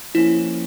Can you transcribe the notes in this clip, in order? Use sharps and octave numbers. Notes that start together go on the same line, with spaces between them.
F3 A#3 C#4 E4